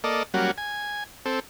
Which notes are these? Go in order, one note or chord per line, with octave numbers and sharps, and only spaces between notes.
A#3 A4 D5 D#5
F#3 G3 A#3 C#4 F#4
G#5
C4 A4